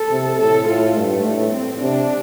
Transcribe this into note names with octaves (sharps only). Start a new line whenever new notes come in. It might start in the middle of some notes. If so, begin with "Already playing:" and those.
Already playing: A4
C3
A2 A4
A2 F4
G2 A3
A2
C4
C3 D4